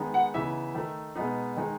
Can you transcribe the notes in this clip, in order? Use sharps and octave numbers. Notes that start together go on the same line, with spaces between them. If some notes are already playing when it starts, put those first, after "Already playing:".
Already playing: D#3 G#3 B3 D#4
F#5
C#3 E3 B3 D#4 E5
D#3 A3 D#4
B2 G#3 B3 D#4
D#3 G#3 D#4